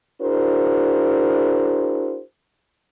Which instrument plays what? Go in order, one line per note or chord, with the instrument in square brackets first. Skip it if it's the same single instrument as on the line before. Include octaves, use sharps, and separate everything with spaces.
[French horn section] D4 E4 F#4 G#4 A#4 C5